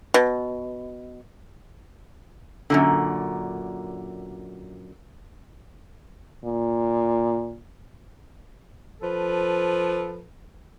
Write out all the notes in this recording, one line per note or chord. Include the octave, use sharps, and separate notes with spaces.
B2
F#2 A#2 D3
A#2
F3 A4 B4